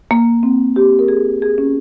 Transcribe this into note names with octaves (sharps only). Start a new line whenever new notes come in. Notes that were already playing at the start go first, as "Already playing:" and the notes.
A#3
C4
G4
A#4
G#4
G#4
C#4